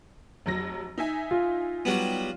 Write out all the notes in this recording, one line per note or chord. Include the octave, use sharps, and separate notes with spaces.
F1 F#3 A#6
D#4 E5 G#5
F4
F#3 G3 B3